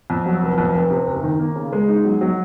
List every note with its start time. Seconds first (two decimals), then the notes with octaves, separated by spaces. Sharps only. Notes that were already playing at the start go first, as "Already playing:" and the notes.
0.10 F2
0.26 F#3
0.42 F1
0.58 F2
0.74 F1
0.90 C3
1.07 F#1
1.23 D#3
1.39 A#3
1.56 C#3
1.73 G#3
1.88 D#4
2.05 F#3
2.21 F#3